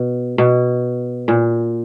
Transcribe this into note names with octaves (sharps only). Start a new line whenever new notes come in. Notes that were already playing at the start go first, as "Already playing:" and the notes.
Already playing: B2
B2
A#2